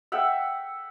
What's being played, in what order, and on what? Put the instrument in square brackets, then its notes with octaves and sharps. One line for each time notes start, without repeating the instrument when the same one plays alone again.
[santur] E5 F#5 G5